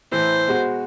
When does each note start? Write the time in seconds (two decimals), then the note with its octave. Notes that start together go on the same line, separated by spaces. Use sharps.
0.12 A2 E3 C5
0.48 B2 G#3 F#4